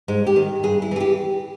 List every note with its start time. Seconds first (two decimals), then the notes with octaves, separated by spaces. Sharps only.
0.08 G#2 G#3
0.27 G4
0.36 D#3
0.63 G2 G#4
0.82 E4
0.91 E3 G#4
1.00 G4